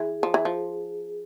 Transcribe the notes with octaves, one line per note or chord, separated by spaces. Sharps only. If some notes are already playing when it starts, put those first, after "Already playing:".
Already playing: E3 G#4
F3
E3
F3